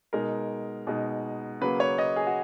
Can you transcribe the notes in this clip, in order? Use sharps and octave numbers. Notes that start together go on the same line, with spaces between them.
B2 G#3 D#4 A#4
B2 G#3 D#4
C#3 F#3 A#3 B4
C#5
D#5
G#4
F#4